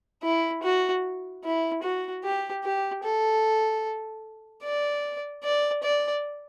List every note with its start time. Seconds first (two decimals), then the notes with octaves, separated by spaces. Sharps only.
0.23 E4
0.63 F#4
1.44 E4
1.83 F#4
2.24 G4
2.64 G4
3.04 A4
4.63 D5
5.43 D5
5.83 D5